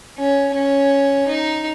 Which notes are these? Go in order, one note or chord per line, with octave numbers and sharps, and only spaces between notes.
C#4
C#4
D#4